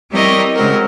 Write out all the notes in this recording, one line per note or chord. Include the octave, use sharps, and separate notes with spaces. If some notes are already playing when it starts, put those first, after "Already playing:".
G3 C4 E4 A#4 C#5 D#5
C#3 G#3 C4 F#4 A#4